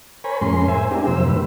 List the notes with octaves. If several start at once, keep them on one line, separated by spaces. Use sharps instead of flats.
A#4 C5 C#5 G#5 B5
F2 A2 G#3 C#4 A#4 C6
C5 E5 G#5
C4 D4 E4 G4 G#4 A#4
F2 C3 F#3 A#3 C5 E6
G2 A#2 D#3 B4